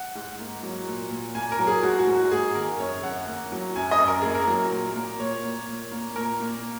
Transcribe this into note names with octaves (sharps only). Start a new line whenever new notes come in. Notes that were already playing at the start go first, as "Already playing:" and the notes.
Already playing: F#5
G#2
A#3
F#3
A#2
A#2
A#3 G#5
A#4
F#3
G#4
G#2 F#4
F#4
G#2
F#4
A#3 G#4
D#3 A#4
F#2 C#5
F#2 F#5
A#3
F#3
F#2 G#5
D#5
F#2
A#4
A#3 G#4
A#4
F#3
A#2
A#3
A#2 C#5
A#3
A#2
A#3
A#2 A#4
A#3